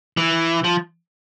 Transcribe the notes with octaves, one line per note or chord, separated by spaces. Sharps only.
E3
F3